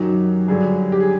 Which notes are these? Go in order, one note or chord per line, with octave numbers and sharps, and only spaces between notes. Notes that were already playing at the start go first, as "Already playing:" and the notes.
Already playing: F#2 D#3 F#3 G4
G2 D3 F#3 G#4
G4
G#4